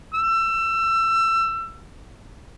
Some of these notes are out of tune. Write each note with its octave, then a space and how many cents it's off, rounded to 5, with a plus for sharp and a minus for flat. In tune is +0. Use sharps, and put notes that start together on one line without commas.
E6 +25